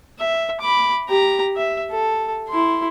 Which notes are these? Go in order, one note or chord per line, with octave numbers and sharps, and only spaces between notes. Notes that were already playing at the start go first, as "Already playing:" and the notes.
E5
B5 D6
G4 A#5
E5
A4
E4 C6